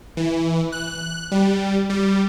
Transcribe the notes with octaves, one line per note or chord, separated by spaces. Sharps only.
E3
F#6
G3
G3